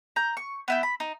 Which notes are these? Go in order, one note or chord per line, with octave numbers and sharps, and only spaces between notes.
A#5 G6
C#6
B3 E4 G5
B5
D#4